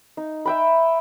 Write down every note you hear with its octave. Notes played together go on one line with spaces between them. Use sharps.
D#4
E5 G5 B5